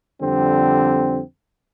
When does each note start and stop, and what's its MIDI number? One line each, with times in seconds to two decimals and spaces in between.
0.20 1.20 41
0.20 1.20 50
0.20 1.20 55
0.20 1.20 60